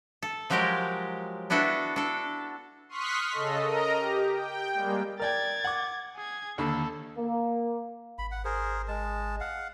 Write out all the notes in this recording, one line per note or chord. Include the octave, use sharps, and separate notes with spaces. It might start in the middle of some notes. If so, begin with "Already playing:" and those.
A4
F3 F#3 G#3 G4 A#4 G5
B3 D4 E4 F#4 A4
D4 A4
C6 C#6 D#6 F6 F#6 B6
C#3 A4 D#5
A#4 D#5 A#5
G4
G5
G3 G#3 A#3
A#4 D5 G5 G#6 A6
F#5 D6
G#4 G#6
D#2 D3 A4 B5
A#3
G#1 B5
F#5
G#4 A#4 C5
G#3 A5
F5 F#5